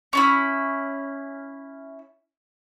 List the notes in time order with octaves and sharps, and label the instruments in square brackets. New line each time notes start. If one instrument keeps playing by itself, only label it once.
[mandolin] C#4 D4 E4